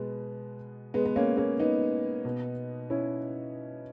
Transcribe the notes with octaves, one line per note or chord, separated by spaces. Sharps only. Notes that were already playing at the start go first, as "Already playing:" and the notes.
Already playing: B2 G#3 B3
G#3 B3
B3
A#3 C#4
A#3 C#4
B3 D#4
B2
C#4 E4